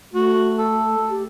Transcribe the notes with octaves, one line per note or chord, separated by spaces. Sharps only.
A3 F#4
A4
G4